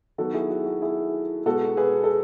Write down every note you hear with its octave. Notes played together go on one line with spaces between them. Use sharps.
D#3 F#3 B3 F#4 A4
E4 G#4
F#4
F#4
E4 G#4
B2 G#3 B3 F#4 A4
G#4 B4
A4